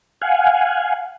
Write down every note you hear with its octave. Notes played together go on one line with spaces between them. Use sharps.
F5 F#5 G#5